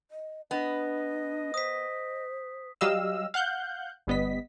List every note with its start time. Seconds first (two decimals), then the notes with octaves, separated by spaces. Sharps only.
0.11 D#5
0.51 B3 D4 D#5
1.54 C5 D#6 B6
2.81 F#3 G3 G4 D#5 F5 E6
3.34 F5 F#5 F#6 G6
4.07 G1 G3 B3 D#5 B6